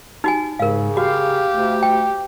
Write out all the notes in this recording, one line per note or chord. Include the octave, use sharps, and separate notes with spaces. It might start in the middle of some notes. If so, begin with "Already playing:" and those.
D#4 F#4 G#5
G#2 C#3 A#4 F5
F#4 G4 F5
D2
G5